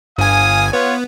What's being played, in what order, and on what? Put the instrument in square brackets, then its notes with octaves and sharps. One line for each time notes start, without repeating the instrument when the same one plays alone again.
[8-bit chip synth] G1 G#5 [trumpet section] F5 D#6
[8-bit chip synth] B3 [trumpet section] F4 C#5